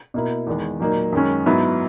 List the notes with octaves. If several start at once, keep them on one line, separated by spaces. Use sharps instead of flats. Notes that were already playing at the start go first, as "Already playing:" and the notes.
B2 A#3 E4
E2 D#3 G#3
A#2 F#3 A#3 D#4
F#2 D#3 G#3 C#4
G#2 F#3 B3 E4